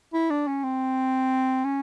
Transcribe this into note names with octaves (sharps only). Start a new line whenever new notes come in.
E4
D4
C#4
C4
C#4